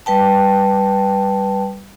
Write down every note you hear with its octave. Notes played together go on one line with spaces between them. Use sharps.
G3 B4 G5 A5